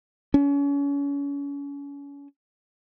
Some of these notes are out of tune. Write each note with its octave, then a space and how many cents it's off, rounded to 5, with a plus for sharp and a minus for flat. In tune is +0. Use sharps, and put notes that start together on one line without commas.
C#4 +35